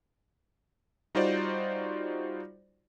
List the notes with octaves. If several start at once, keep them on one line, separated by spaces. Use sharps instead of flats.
G3 D#4 F4 F#4 C5 D5